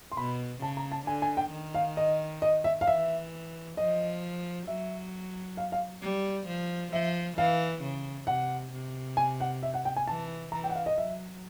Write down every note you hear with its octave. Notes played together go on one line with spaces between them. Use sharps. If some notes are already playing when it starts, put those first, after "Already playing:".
C6
B2 B5
C#3 A5
A#5
A5
D3 G#5
G#5
G5
D#3
F5
D#5
D#5
E5
F5
E3 E5
F3 D#5
F#3 E5
F5
F5
G3
F3
F3 E5
E3 F5
C#3
C3 F#5
C3
G#5
F#5
E5
F#5
G5
G#5
E3 A5
E3 A#5
G5
F#5
F5
D#5
F#3 E5